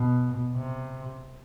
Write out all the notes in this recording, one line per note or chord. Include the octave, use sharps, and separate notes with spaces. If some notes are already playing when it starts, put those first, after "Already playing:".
Already playing: B2
C3